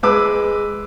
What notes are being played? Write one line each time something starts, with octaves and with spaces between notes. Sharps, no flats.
G#3 B4 D6 E6